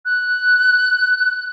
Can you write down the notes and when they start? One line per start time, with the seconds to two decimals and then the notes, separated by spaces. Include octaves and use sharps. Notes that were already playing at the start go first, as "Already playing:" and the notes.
0.05 F#6